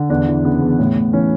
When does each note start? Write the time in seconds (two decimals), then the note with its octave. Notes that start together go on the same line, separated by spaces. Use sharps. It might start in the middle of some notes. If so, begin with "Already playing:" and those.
Already playing: D3
0.10 E2 D4
0.28 E3
0.45 C#3 B3
0.61 E2
0.79 A2
0.96 A2
1.13 E3 C#4